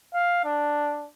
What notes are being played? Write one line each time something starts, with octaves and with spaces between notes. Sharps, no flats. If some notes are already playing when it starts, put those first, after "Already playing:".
F5
D4